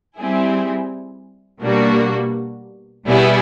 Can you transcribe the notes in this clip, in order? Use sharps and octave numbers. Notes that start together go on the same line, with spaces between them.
G3 C4 E4 G#4
B2 G3 A#3 D4 F#4
B2 G3 B3 E4 G#4